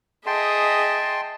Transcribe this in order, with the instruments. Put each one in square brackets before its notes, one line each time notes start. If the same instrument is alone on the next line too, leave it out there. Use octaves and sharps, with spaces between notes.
[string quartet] G#4 D#5 E5 [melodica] G5 A5 C6